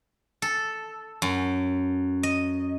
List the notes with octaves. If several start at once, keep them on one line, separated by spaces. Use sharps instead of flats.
A4
F#2
D#5